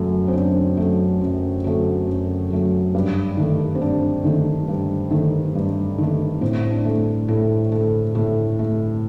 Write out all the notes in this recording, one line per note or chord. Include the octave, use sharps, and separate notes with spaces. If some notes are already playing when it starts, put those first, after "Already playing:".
Already playing: F#2 F#3 A3
C4
F#2 D4
F#3 A3
F#2
F#3 A3
F#2
F#3 A3
G2
D#3 A3
C4
G2 D4
D#3 A3
G2
D#3 A3
G2
D#3 A3
A2 C4
D4
A3
A2 A4
A3 A4
A2 A4
A3